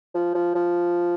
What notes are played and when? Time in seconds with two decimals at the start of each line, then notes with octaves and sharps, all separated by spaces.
0.15 F3
0.35 F3
0.55 F3